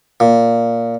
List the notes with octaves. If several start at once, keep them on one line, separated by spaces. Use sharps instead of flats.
A#2